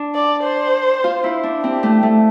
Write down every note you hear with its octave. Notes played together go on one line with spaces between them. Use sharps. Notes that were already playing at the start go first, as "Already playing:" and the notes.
Already playing: D4
D5
C5
F4
E4
D4
C4 G4
A3
A3